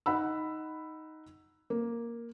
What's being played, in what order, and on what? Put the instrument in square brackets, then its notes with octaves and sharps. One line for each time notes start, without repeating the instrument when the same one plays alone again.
[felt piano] D#4 F#5 B5 E6
A#3